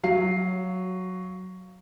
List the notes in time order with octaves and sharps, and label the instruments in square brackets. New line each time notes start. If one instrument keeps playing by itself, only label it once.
[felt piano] F#3 F5 C7